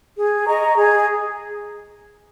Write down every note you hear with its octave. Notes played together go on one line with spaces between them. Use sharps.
G#4
D#5 A#5 C#6
G#4